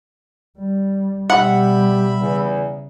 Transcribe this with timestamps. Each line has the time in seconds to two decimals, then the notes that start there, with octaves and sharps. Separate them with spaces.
0.58 G3
1.30 B2 G3 G4 E5 F#5 B5
2.21 E2 C#3